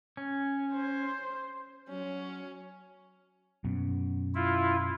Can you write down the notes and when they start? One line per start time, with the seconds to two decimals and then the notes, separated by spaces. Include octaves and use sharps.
0.17 C#4
0.73 C5
1.90 F#3 C#4
3.64 F#2 B2
4.35 E4 F4